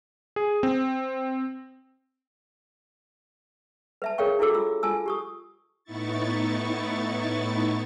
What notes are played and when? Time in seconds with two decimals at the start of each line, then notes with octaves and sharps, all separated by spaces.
0.36 G#4
0.63 C4
4.02 B4 E5 A5
4.18 G#4 A#4 C#5 F5 G5 C#6
4.39 D4 E4 F#4 A4 D6 E6
4.54 F4 E6
4.83 F4 G#5 A5 E6
5.06 G4 C#6 D#6
5.84 A2 B3 D#4 E4 C#6 A6